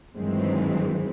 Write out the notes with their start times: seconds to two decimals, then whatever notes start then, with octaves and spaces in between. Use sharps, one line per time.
0.17 G2 D#3 E3 F#3 G#3 C4